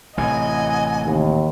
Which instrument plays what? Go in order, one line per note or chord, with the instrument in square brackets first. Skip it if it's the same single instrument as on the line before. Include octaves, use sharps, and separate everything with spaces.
[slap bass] A1 C3 E3 [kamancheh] D#5 F#5 [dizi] G#5
[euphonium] D#2